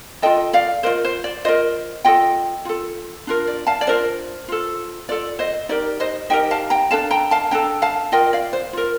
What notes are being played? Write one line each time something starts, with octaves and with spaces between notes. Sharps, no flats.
F4 A4 D#5 G5
D5 F5
F4 A#4 C5 D#5
C5
D5
F4 A#4 C5 D#5
F4 A4 D#5 G5
F4 A4
D4 F4 A#4
D5
F5 A5
D5
D4 F4 A#4 C5
F4 A4
F4 A4 D5
C5 D#5
D#4 G4 A#4 D5
C5 D#5
D#4 G4 A#4 D#5 G5
F5 A5
G5 A#5
D4 A4 F5 A5
G5 A#5
F5 A5
D4 A4 G5 A#5
F5 A5
F4 A#4 D#5 G5
D5 F5
C5
F4 A#4